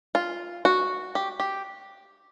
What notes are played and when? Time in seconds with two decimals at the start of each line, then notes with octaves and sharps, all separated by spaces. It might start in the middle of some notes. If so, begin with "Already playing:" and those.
0.15 F4
0.65 F#4
1.15 G4
1.40 G4